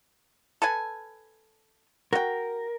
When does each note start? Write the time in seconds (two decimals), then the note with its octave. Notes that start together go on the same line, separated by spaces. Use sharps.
0.62 A4 B4 G#5
2.13 F#4 A#4 G5